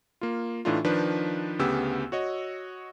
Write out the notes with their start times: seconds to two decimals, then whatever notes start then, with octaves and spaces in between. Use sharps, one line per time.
0.21 A#3 F4
0.65 A2 E3 A3 D4 D#4 F4
0.85 D#3 F3 D4 B4
1.59 D2 C#3 B3 G4 E6
2.12 F#4 C#5 D#5